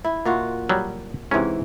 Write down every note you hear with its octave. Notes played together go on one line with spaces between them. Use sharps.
E4
A#2 F4 F#4
F#3 G3
G#2 C3 E3 C#4